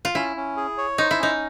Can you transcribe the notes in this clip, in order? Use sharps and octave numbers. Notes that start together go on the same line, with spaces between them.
F4
C#4 E4
C#4
G#4
C#5
D#4 C5
E4
C#4 D#4